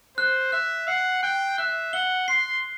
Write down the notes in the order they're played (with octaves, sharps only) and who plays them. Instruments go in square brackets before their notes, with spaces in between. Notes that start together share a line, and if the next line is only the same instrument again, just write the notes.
[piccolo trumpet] C5 [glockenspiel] F#6
[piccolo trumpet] E5 [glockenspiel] F#6
[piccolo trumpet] F#5 [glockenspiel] C7
[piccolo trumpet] G5 [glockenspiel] F#6
[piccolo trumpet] E5 [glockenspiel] F#6
[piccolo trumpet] F#5 [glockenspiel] G7
[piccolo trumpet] C6 [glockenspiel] C7